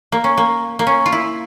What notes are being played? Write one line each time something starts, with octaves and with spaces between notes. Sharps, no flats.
A#3
C#4
A#3
A#3
C#4
F4
E4